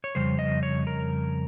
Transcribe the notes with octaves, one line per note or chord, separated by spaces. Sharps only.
C#5
F2 C#3 G3 C5
D#5
C#5
A#4